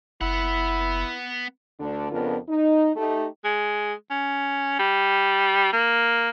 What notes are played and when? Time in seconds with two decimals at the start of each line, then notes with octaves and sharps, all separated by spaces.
0.21 F#1 B3 E4 F#5
1.80 D2 D3 D4
2.12 F2 C#3 B3 D4 F4 A#4
2.49 D#4
2.96 A3 D#4 G4
3.45 G#3
4.10 C#4
4.79 G3
5.73 A#3